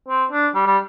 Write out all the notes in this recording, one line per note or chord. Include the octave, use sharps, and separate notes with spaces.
C4
D4
G3
G3